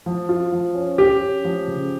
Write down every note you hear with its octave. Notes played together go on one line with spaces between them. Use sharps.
F3
F4
F3
C#4
C#4 G4
C#4
F3
C#3